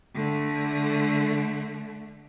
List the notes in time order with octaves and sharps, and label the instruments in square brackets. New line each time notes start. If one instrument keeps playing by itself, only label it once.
[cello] D3 A3